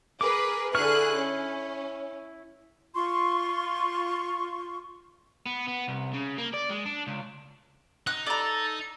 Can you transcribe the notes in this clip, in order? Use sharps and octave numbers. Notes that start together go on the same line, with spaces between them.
G#4 A#4 B4 D6
D3 E4 G#4 C#6 F6 F#6
C#4
F4 C6 C#6
B3
B3
C2
C#3
A#3
D5
G#3
D4
C#2
D#4 F#6
A4 D5 A#5